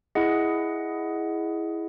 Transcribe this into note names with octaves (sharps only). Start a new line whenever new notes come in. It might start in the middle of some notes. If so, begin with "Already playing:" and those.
E4 G#4 D#5 F#5